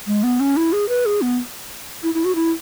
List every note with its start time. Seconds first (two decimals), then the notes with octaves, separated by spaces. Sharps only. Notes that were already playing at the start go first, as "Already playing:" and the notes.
0.07 G#3
0.23 B3
0.40 C#4
0.57 E4
0.73 G#4
0.89 B4
1.06 G#4
1.22 B3
2.03 E4
2.14 E4
2.25 F#4
2.35 E4